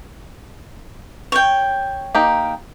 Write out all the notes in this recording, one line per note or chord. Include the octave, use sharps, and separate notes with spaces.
C#5 G5
A#3 D#4 G4